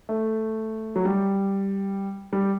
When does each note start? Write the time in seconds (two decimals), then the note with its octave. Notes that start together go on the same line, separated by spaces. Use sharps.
0.09 A3
0.96 F#3
1.05 G3
2.33 G3